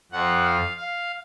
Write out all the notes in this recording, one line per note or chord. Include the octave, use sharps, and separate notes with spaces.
F2 F3 F#5
F5
F5